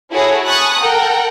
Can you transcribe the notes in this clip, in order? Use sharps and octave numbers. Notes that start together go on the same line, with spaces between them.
E4 F#4 G#4 A4 C#5
G#5 A5 B5 C#6 D#6 F#6
A4 A#4 F#5 G5